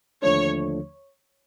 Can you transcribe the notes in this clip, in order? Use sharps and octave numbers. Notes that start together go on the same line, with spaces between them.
D#2 D3 F3 A3 D4 C#5